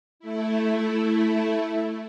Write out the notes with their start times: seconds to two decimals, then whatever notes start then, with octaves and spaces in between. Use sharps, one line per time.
0.19 A3 E4